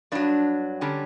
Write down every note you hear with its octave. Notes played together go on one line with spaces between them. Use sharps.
G2 F#3 D4
D3 G3 C#4